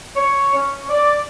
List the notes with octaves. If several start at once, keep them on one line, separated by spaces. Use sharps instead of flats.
C#5
C#4
D5